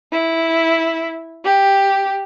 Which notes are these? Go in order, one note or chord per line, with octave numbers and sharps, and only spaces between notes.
E4
G4